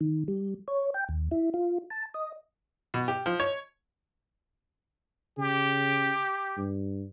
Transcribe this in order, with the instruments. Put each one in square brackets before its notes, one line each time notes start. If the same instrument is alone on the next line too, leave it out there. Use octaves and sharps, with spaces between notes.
[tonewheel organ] D#3
G3
C#5
G5
D#2
E4
F4
A5
D#5
[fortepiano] B2
G4
F3
C#5
[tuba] C#3 [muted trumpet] G4
[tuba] G2